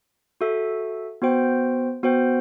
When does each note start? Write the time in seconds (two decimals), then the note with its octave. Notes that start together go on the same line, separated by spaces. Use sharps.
0.41 F#4 A4 E5
1.22 B3 F#4 C5 G5
2.03 B3 F#4 C5 G5